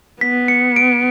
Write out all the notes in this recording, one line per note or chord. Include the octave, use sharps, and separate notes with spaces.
B3 B6
C#7
D7